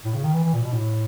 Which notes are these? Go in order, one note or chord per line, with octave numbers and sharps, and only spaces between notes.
A2
C#3
D#3
E3
E3
A#2
B2
A2